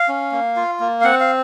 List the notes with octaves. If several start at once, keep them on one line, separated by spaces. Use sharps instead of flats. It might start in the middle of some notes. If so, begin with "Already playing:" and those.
Already playing: F5
C#4
A#3
F4
A#3
F5
C4 F#5
F5